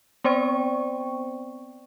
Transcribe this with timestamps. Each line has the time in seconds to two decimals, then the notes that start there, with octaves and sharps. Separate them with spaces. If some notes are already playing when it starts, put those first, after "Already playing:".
0.24 B3 C4 C5 D5 G5 C#6